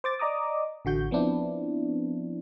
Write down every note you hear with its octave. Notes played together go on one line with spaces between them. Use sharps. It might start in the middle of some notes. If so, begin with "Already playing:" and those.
C5 D6 A6
D5 D#5 A#5 D6 D#6
A1 D3 F#4 G6
F3 B3 C4 D4 E4